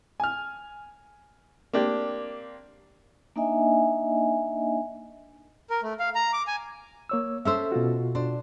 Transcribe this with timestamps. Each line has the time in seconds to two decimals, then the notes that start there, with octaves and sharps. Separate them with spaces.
0.20 G#5 F6
1.73 A#3 C4 D4 G4
3.36 A#3 D4 D#4 D#5 E5 G#5
5.70 A#4
5.83 A3
6.00 F5
6.15 A#5
6.33 D6
6.47 G#5
7.09 A#3 C#5 E6
7.45 C#4 A4 C5 E5 E6
7.72 B2 F4 F#4
8.15 D4 C5